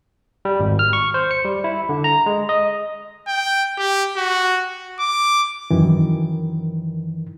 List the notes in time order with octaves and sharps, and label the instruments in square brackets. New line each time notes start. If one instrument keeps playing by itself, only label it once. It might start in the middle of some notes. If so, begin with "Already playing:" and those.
[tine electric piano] G3
G#1
F6
C#6
C5
C#7
G3
E4
D3
A#5
G#3
D#5
[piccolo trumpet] G5
G4
F#4
D6
[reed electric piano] F#2 D#3 E3